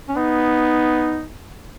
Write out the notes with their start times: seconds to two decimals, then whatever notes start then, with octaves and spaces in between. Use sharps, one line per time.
0.09 C#4
0.17 B3 D#4